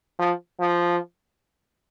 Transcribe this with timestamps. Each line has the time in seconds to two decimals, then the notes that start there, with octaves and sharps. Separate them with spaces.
0.19 F3
0.60 F3